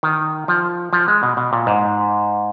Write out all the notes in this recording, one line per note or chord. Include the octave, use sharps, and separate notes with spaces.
D#3
F3
F3
G#3
B2
B2
A#2
G#2